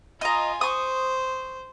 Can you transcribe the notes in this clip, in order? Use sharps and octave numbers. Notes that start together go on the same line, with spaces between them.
F4 D#5 G#5 A#5
C5 C#6 D#6